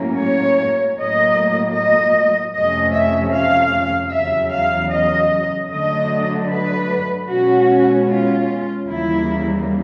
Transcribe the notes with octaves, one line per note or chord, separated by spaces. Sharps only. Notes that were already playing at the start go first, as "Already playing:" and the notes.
Already playing: A2 F#3 A#3 C#4
C#5
A2 F#3 A#3 D#5
D#5
F2 C3 F3 A3 C#4 D#5
E5
F5
E2 C#3 F#3 E5
F5
D#5
D3 F#3 A3 D4 D#5
B4
B2 G#3 C#4 F#4
F4
D#2 C#3 E3 G3 A#3 E4